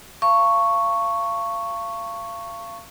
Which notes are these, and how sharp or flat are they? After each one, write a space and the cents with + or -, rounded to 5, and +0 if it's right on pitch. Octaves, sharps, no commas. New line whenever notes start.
F5 -30 A5 +40 C#6 +0